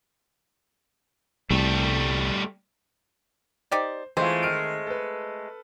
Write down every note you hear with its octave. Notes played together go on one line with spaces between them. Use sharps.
C2 G3 A3
D#4 G4 C5 D5
E3 G#3 A3 C4 F4 C5
D#3 F6 D7
A4 B4